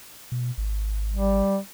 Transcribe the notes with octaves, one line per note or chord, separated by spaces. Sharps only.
B2
G#1
G3